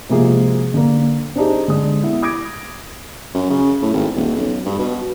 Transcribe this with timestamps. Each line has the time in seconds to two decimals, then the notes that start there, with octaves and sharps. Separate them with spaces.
0.09 C3 F3 G#3 A#3 F#4 G#4
0.74 D3 A#3
1.36 C4 D4 D#4 G4 G#4
1.68 D3 G#3 D#6
2.03 B3 E4
2.22 D6 D#6 G#6 A#6 D7
3.35 F#2
3.50 C#3
3.82 A2
3.94 G#1
4.16 D#1
4.36 B1
4.66 G2
4.79 B2